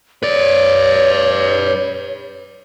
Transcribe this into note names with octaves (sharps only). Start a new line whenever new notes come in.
B4 C#5 D5